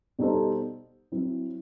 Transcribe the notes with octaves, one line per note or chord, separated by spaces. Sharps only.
B2 G3 D#4 A4 C5
F#3 C4 E4